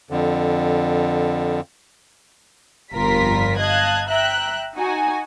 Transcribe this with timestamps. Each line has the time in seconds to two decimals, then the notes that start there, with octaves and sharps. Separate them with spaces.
0.10 F2 D3
2.93 G1 F2 G3 F4 A#4 B6
3.59 D#5 F5 A5 F#6 G#6
4.08 E5 G5 A#5 F#6
4.76 D#4 F#4 G#5